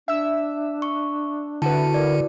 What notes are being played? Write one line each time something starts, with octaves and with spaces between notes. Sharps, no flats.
D4 E5 E6
C#6
D3 E4 F#4 B4 A5
A#4 D5